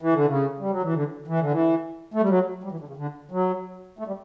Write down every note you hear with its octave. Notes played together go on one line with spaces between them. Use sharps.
E3
D3
C#3
G3
F#3
E3
D3
E3
D3
E3
A3
G3
F#3
G3
E3
D3
C#3
D3
F#3
A3
G3